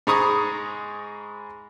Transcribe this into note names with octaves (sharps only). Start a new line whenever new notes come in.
G#2 G#3 A#5 B5 C#6 D#6